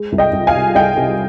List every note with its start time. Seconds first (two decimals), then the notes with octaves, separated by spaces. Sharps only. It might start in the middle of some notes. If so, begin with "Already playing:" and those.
Already playing: G#3
0.12 C2
0.18 D#5 G5
0.33 C2
0.47 F5 G#5
0.54 C3
0.75 C2 D#5 G5
0.97 C3